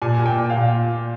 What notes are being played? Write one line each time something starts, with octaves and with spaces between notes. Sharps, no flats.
A#2 G#5
A#2
G5
A#2
F5
A#2